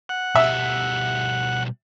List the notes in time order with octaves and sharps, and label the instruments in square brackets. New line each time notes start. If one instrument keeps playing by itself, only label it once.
[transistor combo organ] F#5
[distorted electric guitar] B2 G3 [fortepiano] E5